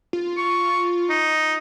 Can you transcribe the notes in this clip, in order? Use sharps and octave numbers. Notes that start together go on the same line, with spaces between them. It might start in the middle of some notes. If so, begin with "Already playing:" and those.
F4
C#6
D#4